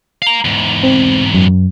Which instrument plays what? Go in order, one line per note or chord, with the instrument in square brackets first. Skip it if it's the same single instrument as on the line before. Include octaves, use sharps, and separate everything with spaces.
[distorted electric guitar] F5 A#5
E2 G#2
[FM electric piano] C4
F#2